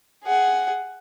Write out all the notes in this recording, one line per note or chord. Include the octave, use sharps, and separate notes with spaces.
G#4 F#5